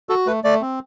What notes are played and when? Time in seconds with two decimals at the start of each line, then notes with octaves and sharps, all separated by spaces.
0.09 F#4 A4
0.27 A3 B4
0.44 A3 D5
0.61 C4